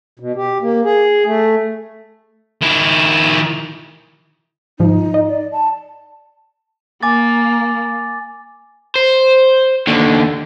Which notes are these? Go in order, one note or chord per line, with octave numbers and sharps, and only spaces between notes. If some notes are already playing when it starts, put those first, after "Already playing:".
B2
G4
A#3
G#4
A3
D#3 E4
G#2 F3 D#4
D#5
D5
A5
A#3 G#5 D6 A6
C5
D#2 D3